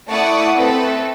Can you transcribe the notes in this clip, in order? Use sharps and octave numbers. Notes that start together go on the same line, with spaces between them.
A3 E4 D5 F#5 C#6 D#6
A3 C4 A4 B4